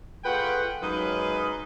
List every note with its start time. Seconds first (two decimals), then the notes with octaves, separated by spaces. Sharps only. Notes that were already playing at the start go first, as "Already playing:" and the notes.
0.25 A3 F4 G#4 B4 F#5 G5
0.81 F#2 F#3 G#3 D#4 B4 F5